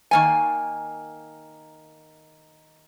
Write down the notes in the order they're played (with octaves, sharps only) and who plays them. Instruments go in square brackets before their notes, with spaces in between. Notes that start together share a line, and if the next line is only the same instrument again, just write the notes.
[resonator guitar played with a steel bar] D#3 A#3 G#5